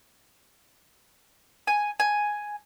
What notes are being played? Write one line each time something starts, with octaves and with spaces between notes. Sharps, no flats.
G#5
G#5